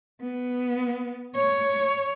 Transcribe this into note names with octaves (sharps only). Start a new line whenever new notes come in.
B3
C#5